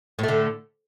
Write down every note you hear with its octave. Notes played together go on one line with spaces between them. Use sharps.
A2 D3 A3